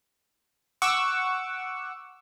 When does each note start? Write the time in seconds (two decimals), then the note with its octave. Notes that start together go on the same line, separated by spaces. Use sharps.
0.82 F#5 C#6 D6 E6